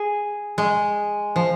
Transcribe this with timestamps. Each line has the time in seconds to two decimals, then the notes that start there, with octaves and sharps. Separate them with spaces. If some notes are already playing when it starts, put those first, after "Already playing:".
Already playing: G#4
0.58 G#3
1.36 F3